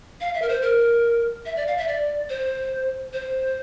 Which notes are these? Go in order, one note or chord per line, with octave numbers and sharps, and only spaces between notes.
F5
E5
A#4
C5
A#4
E5
D5
F5
E5
D5
C5
C5